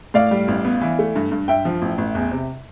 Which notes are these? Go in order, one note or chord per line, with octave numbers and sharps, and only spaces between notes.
A2 D5 F5
G3
A1
B3
E3
A3
G2
G2
G2 E5 G5
F3
A1
A1
E2
C3